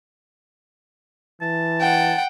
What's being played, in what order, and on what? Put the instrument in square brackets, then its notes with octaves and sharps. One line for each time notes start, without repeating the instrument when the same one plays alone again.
[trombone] E3 [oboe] A5
[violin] F#5 G5